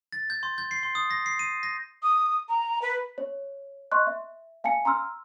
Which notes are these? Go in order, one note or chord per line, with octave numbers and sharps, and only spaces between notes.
A6
G6
C6
G6
C7
C6
D#6
A#6
C7
D#7
A#6
D#6
A#5
B4
C#5
D#5 C6 C#6 F#6
E5
F5 G#5 A5 C#7
A#5 C6 E6 F6